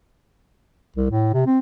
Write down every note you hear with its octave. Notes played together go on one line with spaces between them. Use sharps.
C2
A2
C3
C4